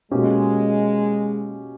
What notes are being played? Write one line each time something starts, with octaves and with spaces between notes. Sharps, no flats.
B2 G#3 A#3 C#4 G4